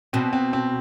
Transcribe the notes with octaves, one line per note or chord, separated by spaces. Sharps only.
B2 C4
C4
C4